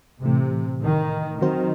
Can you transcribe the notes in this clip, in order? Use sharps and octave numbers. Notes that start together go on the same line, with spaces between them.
A2 C3 E3 A3
D#3
D#3 F#3 C4 F#4 C5